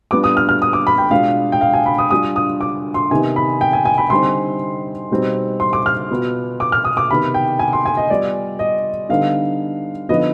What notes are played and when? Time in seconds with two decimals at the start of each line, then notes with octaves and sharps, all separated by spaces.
0.11 G3 B3 D4 F4 D6
0.24 D#6
0.37 F6
0.49 F6
0.62 D#6
0.73 D6
0.87 B5
0.98 G5
1.11 B2 G#3 D4 F4 F5
1.52 G5
1.61 F5
1.73 G#5
1.86 B5
1.98 D#6
2.10 G3 D4 F4 D#6
2.36 D#6
2.61 D6
2.94 C6
3.11 C3 D#3 B3 D#4 G#5
3.36 B5
3.61 G5
3.73 G#5
3.85 G#5
3.98 B5
4.10 D3 G3 C4 D#4 C6
5.11 B2 G3 C4 D#4
5.60 C6
5.73 D6
5.86 F6
6.11 B2 B3 F4
6.60 D6
6.72 F6
6.85 D#6
6.97 D6
7.10 C3 D#3 B3 B5
7.34 G5
7.59 G#5
7.73 C6
7.86 G#5
7.97 D#5
8.10 G3 B3 F4 D5
8.59 D#5
9.09 D3 G3 B3 D#4 F5
10.09 D3 F3 B3 D#4 D#5